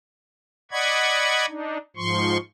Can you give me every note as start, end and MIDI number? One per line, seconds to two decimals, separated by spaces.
0.71 1.46 74
0.71 1.46 75
0.71 1.46 78
0.71 1.46 83
0.71 1.46 85
0.71 1.46 92
1.48 1.78 62
1.48 1.78 63
1.97 2.37 44
1.97 2.37 53
1.97 2.37 84
1.97 2.37 85